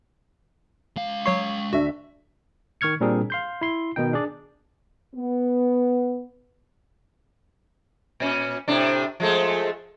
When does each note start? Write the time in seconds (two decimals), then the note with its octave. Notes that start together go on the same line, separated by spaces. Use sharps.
0.96 G#3 F5
1.26 F#3 C#5 C#6 C7
1.73 D2 D4 F#4 E5
2.81 D#3 C#6 F6 G#6 C#7
3.01 A#2 G3 C4 D4 G#4 A#4
3.30 F5 C6 G6
3.61 E4 C6
3.96 B2 D#3 D#4 G5
4.13 D4 G#4 D5
5.16 B3
8.20 A#2 C#4
8.68 A2 C3 D4
9.20 F3 G#3 A3